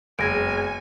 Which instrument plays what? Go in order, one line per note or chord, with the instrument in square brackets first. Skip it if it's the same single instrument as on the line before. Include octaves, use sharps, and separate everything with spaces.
[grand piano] F#1 [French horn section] G#3 B3 G#4 [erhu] G#5 [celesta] G#6 A#6 D7